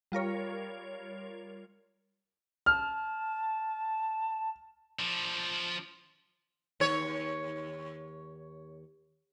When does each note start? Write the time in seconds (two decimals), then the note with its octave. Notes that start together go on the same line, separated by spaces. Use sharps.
0.12 G3 F4 A#4 C#5
2.66 A5 F6
4.99 F3 D4
6.80 D#2 C#5